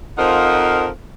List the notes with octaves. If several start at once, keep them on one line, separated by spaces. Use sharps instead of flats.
F2 F3 D#4 F4 A#4 F#5